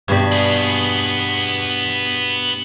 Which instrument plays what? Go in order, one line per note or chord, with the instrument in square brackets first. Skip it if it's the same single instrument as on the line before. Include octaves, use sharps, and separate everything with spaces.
[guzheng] G2 B2 G3
[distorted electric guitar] B3 G#4